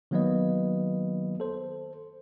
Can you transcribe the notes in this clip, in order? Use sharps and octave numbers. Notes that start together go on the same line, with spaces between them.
D#3 F#3 A#3 B3 B4 D#5
A4 C5